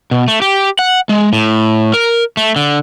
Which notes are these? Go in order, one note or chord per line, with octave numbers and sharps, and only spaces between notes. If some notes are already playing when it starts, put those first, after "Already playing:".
B2
A3
G4
F#5
G#3
A2
A#4
A3
D3